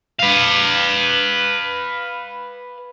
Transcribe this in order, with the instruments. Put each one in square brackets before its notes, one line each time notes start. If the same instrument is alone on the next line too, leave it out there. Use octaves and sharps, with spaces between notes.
[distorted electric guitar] B4 F5